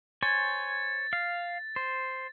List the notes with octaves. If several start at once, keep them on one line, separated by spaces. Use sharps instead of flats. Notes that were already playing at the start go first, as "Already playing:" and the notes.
C5 C#5 G#5 A6
F5
C5